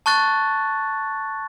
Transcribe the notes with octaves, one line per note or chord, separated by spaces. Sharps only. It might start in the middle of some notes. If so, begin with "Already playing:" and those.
A5 C#6 F#6 A6